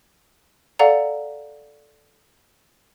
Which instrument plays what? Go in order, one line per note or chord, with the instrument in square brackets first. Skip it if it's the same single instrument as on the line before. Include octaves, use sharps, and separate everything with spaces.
[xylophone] A4 D5 F5 F#5 A#5